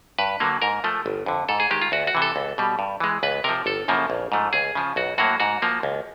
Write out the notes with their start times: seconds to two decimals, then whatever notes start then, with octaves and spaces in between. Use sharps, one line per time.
0.18 G2 B4
0.40 D3 F#3 A#3
0.62 G#2 A#4
0.84 F3 A3
1.06 G1
1.26 F2 D3
1.49 G#2 A4
1.60 G#4
1.71 D#3 G#3 G4
1.81 F4
1.92 D2 F#4
2.07 F#4
2.15 C3 E3
2.22 A4
2.36 C#2
2.58 B2 G3
2.79 G2
3.00 E3 G#3
3.23 C#2 B4
3.44 C3 F3 A#4
3.66 G1 A4
3.88 F#2 C#3 F3 A#3
4.10 A#1
4.32 G#2 F3 A3
4.53 C#2 G#4
4.75 C#3 F3
4.96 B1 F#4
5.18 A2 F#3 A#3 F#4
5.40 G#2 F#4
5.62 F3 A#3
5.83 C#2